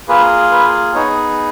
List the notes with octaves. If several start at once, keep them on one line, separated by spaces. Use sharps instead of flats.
A#3 F4 G#4 B4
B4
B3 D#4 G#4 C#5